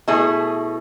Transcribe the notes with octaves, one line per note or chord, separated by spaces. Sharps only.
B2 A3 E4 G#4